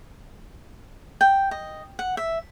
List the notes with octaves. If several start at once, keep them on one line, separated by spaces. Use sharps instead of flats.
G5
D#5
F#5
E5